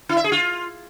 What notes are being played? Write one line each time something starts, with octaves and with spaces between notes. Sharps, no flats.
E4
E5
G#4
F4